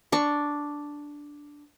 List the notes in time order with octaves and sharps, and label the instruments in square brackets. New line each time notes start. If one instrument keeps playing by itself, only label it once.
[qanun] D4 C#6